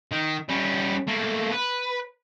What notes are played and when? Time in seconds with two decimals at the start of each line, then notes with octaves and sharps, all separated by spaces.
0.12 D#3
0.49 G3 C#4
1.08 A3 A#3
1.52 B4